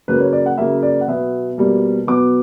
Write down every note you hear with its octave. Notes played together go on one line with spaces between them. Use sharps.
C#3 F#3 A#3 B4
C#5
D5
F#5
C#3 F#3 A#3 E5
D5
F#5
B2 F#3 B3 E5
B2 G3 A#3
B2 F#3 B3 D6